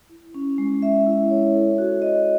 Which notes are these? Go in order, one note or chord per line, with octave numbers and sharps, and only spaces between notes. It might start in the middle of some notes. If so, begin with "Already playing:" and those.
E4
C#4
G#3
E5
E4
C#5
A4
F#4
D#5